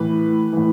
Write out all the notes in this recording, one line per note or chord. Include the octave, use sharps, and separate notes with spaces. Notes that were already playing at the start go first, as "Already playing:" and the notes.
Already playing: A2 E3 B4
A2 E3